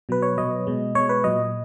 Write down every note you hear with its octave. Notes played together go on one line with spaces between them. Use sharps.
B2 F#3 B4
C#5
B2 F#3 D#5
B2 G#3
B2 G#3 C#5
B4
A#2 F#3 D#5